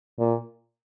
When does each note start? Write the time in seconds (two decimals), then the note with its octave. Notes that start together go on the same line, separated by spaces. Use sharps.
0.19 A#2